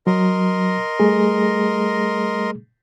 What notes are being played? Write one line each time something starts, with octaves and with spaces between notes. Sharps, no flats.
F#3 A#4 D#5 C6
G3 A3 G#4